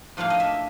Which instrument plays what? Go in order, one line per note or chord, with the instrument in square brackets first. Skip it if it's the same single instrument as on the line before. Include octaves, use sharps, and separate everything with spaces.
[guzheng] A2 F3 A#3 D4 F5
D#5
E5